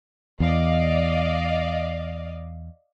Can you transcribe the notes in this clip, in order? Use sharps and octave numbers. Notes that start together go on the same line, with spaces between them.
E2 D5 D#5 F5